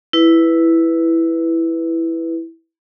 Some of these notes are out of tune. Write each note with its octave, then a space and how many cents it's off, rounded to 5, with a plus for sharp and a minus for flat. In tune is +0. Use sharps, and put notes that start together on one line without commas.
E4 +0 B4 +0